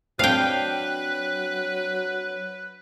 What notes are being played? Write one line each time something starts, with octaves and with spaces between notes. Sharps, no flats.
F#3 C4 D4 B4 F5 G5